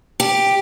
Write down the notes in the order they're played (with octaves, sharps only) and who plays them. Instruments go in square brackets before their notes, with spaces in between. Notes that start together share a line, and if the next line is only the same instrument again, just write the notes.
[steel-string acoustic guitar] G4